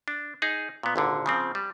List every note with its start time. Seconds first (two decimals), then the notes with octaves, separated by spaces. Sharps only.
0.08 D4
0.42 D#4 G#4
0.83 A#2 B3
0.96 G#1 A#2 D3
1.26 C#3 F3 C4
1.55 G3